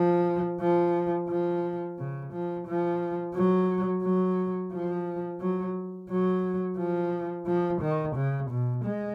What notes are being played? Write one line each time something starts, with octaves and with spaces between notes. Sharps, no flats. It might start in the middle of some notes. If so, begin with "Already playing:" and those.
Already playing: F3
F3
F3
C#3
F3
F3
F#3
F#3
F3
F#3
F#3
F3
F3
D#3
C#3
B2
G#3